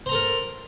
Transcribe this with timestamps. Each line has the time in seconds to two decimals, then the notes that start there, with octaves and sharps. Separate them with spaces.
0.06 C5
0.09 A#5
0.12 A4
0.15 A#4